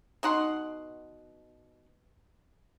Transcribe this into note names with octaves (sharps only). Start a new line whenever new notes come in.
B2 D#4 F#5 C6